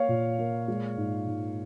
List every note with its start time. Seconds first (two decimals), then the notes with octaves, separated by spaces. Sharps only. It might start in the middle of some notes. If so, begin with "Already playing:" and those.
Already playing: A#3 C#5 F5
0.08 A#2
0.38 A#3
0.68 G#3
0.97 G#2
1.27 G#2